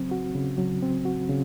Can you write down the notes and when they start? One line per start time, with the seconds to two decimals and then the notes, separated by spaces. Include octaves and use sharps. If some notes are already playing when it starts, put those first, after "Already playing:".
Already playing: C#3 F#3 C4
0.11 F#4
0.35 C#3
0.58 F#3
0.82 C4
1.05 F#4
1.29 C#3